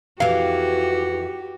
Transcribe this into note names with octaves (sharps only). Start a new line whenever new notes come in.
F2 E3 F#4 G4 F5